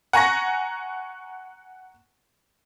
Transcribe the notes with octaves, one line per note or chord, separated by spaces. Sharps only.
F#5 G#5 A#5 C#6 A#6